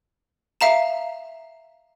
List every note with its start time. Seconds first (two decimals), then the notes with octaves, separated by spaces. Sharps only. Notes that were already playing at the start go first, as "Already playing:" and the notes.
0.61 E5 F5 A#5 E7